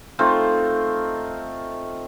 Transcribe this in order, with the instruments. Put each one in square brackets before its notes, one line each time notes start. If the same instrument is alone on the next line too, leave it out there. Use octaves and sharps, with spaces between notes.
[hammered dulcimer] A3 C4 D#4 F4